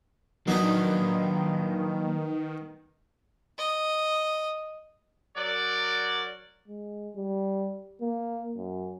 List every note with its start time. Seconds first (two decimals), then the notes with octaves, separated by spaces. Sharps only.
0.48 D#3 F#3 A#3 B3 D4 D#4 D#5
3.58 D#5
5.37 F#3 A#4 D5
6.68 G#3
7.16 G3
8.01 A#3
8.57 F#2